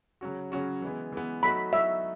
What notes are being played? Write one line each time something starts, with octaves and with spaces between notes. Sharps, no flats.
C#3 F#3 C#4 F#4
C#3 F#3 C#4 F#4
E3 G#3 B3
E3 G#3 B3
F#3 A3 D#4 F#4 B5
F#3 A3 D#4 F#4 E5